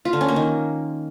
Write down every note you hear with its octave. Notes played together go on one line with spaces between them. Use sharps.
F4
D3
C#4
A#3
D#3